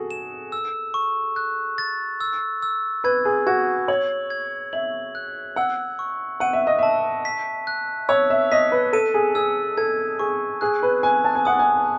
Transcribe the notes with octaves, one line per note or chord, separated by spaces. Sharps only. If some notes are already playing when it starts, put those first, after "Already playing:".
Already playing: F#4 G#4 A4
E7
E6
C#6
F#6
A6
E6
E6
B4 G#6
G#4
F#4 G#6
C#5 F#7
G#6
E5 F#7
F#6
F#5 E6
C#6
F#5 D#7
E5
D#5
E5 A5
B6
F#6
C#5 E6
E5
D#5 B6
B4
A4 D#7
G#4
G#4 E6
A4 G#6
G#4 C#6
G#4 F#6
B4
G#5 F#6
A5
G#5
F#5 D#6
G#5